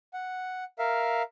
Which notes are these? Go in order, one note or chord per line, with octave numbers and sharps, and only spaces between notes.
F#5
A#4 E5 F5